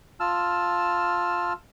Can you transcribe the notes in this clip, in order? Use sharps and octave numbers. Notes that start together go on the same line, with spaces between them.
F4 A5 E6 F6